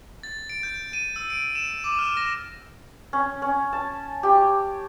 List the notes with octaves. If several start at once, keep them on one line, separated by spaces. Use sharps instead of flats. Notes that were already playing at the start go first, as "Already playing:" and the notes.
A6
D7
G6
D#7
E6
D7
E7
D6
F6
A#6
C#4
C#4
A5
G4